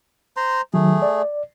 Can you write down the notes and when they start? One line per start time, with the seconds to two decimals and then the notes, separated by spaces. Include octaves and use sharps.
0.37 C5 A#5 C6
0.74 D#3 F#3 A3 G#4
1.02 D5